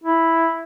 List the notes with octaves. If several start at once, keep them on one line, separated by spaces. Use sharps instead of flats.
E4